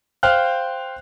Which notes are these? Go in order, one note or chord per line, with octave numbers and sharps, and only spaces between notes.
C5 F5 G5 F6 F#6